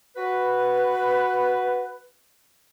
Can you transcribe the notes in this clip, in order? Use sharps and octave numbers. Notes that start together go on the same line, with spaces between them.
F#4 B4